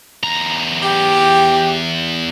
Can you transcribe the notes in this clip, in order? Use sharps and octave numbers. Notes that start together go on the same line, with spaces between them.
E2 A#5
G4